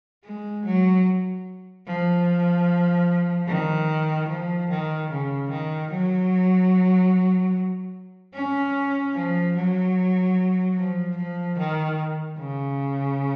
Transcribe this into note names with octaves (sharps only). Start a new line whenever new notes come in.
G#3
F#3
F3
D#3
F3
D#3
C#3
D#3
F#3
C#4
F3
F#3
F3
F3
D#3
C#3